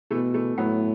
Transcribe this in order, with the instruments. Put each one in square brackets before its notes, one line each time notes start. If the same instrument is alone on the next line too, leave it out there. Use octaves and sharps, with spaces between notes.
[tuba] B2 [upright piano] E3 A3
[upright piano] E3 A3
[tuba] A2 [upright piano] F#3 B3